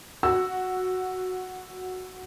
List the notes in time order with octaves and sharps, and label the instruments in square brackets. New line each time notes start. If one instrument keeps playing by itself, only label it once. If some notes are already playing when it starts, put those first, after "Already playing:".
[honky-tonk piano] F#4 [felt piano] E6